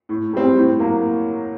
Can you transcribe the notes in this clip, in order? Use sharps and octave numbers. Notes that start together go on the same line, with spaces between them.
A2
G3 C4
A2
F#3 A#3